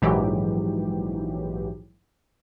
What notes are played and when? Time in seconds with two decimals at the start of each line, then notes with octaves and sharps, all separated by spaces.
0.02 A#1 G#2 E3 F#3 G4